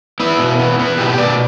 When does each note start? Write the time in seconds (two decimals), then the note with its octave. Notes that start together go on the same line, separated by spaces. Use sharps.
0.20 B3 E4
0.38 B2
0.59 B3
0.79 B3
0.98 B2 G4
1.18 B2 D5